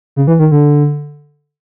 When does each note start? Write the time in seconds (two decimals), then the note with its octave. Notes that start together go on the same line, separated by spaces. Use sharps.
0.16 C#3
0.27 E3
0.39 D#3
0.52 D3